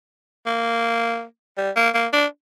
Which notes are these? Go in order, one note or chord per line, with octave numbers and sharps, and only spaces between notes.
A#3
G3
A#3
A#3
D4